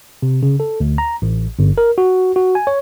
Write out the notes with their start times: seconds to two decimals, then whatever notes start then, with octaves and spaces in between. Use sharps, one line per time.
0.22 C3
0.43 C#3
0.60 A4
0.80 D2
0.98 A#5
1.22 A1
1.59 G1
1.78 A#4
1.98 F#4
2.36 F#4
2.55 G#5
2.67 C#5